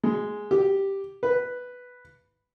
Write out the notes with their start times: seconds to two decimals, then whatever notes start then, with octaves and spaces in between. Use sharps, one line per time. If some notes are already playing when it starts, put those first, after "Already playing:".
0.04 G#3
0.51 G4
1.23 B4